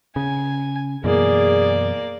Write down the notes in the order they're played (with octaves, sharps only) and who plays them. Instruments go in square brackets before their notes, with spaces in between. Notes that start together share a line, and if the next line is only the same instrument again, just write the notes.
[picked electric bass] C#3 [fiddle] G#5
[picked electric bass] F#2 B2 E3 [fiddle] A#3 D5 [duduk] G#4